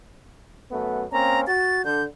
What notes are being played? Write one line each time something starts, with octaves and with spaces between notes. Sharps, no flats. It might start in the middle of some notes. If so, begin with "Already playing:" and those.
F#2 A3 B3
A#3 C4 C#4 A#5
F#4 A6
D3 G6